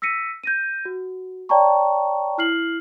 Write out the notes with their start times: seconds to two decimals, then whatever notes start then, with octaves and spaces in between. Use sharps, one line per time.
0.02 E6 A#6 B6 C#7 D#7
0.43 G6 A#6 D#7
0.85 F#4
1.49 C#5 D5 G5 A5 A#5 C#6
2.38 E4 F6 C7 F#7